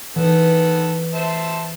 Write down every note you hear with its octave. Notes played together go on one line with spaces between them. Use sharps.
D#3 E3 B3 A4
C5 E5 A5